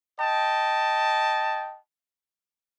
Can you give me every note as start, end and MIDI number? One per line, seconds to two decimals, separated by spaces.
0.19 1.77 75
0.19 1.77 79
0.19 1.77 81